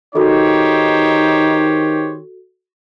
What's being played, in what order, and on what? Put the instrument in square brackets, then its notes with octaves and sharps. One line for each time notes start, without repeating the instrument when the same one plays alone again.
[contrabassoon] D#3 [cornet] D#4 [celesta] F#4 A4 [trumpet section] G4 C5 C#5